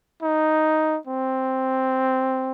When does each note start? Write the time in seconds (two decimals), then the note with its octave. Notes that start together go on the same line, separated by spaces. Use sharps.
0.22 D#4
1.07 C4